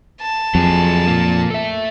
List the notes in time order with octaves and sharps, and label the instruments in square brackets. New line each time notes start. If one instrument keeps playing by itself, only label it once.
[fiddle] A5
[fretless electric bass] F2 [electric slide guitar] F#3 G#4
[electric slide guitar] A#2 A#3
A4 E5